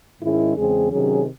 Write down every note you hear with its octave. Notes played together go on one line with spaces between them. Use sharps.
G#2 D#3 G#3 C#4 E4
E2 C#3 G#3 C4 G#4
C3 D#3 F#3 C#4 G#4